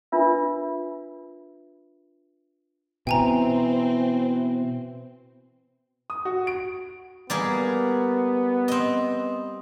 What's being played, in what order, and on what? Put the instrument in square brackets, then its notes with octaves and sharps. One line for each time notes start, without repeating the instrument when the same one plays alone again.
[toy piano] D4 F4 A#4 B4 E5 E6
[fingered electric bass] B2 [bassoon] E3 [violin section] C4 [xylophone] G5 G#5 A#5
[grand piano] D#6
F#4
D7
[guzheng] G3 A#3 G#4 [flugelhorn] B3
[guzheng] C4 D#5